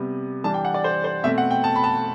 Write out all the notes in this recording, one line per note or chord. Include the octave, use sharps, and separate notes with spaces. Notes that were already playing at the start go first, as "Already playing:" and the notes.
Already playing: C3 G3 B3
E3 G3 D4 A5
G5
F#5
D5
C5
C5
B2 A3 C4 E5
F#5
G5
A5
B5
A5